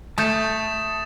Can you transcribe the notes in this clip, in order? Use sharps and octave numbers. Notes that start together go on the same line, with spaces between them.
A3 A5 D#6 G6 A6 E7